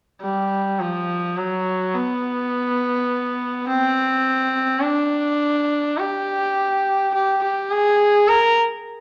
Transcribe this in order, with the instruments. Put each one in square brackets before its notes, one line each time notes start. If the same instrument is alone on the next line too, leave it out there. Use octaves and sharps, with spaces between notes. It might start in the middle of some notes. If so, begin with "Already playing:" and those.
[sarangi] G3
F3
F#3
B3
C4
D4
G4
G4
G4
G#4
A#4